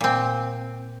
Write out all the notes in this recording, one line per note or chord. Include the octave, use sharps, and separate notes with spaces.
A#2 C4